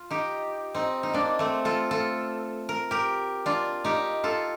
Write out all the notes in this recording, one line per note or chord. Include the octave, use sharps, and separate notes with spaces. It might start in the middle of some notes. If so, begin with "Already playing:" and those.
Already playing: F4
D#4 G4
C4 D#4
D#4
A#3 D4
A3 C4
F4 A4
F4 A4
A#4
G4 A#4
D4 F4
D#4 G4
F4 A4